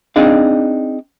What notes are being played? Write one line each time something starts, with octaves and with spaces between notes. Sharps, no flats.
C4 D4 D#4 G#4 F5